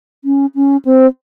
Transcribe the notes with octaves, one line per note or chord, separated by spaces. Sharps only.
C#4
C#4
C4